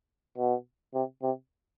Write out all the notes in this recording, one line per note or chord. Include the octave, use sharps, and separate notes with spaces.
B2
C3
C3